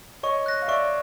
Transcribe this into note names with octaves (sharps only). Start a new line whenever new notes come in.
C#5 D#5 C#6
F#6 A#6
F5
D5 E5 C#6